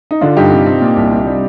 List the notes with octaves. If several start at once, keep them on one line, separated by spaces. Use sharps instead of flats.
D#4
D3 D4 F4
G2 D#4 G4
C3
C4
A#2
C2
C3
G3